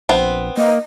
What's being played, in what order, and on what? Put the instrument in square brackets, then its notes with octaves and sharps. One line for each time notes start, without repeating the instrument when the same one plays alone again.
[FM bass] A#1 [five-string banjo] B3 C4
[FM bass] A#3 [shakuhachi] D#5